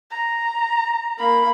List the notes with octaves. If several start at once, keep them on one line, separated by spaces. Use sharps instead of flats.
A#5
A#3 B5